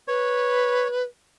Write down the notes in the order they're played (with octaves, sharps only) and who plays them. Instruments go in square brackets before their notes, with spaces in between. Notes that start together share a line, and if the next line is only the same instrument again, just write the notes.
[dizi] B4 [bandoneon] C#5